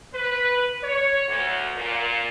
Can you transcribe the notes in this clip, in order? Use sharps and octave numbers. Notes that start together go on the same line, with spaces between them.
B4
C#5
D2
A#2